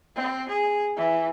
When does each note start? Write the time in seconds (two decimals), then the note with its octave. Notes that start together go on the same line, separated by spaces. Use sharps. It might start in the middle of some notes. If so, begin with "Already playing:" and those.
0.16 C4
0.49 G#4
0.97 E3